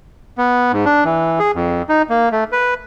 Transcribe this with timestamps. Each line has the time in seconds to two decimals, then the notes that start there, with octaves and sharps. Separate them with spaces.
0.38 B3
0.73 G#2
0.85 D4
1.04 E3
1.39 G#4
1.55 F2
1.89 D#4
2.10 A#3
2.32 A3
2.52 B4